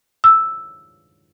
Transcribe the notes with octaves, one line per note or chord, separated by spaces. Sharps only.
E6